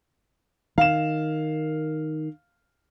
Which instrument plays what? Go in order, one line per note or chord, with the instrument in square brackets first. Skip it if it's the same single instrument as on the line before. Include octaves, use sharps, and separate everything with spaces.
[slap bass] D#3 [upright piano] F5 E7